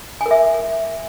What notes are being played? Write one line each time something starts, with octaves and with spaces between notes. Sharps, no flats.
G#5
A#4
E5